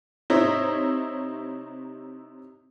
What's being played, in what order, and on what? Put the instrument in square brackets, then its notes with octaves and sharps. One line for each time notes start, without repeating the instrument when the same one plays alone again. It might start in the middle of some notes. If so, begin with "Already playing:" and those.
[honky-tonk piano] C3 C4 D#4 E4 C#5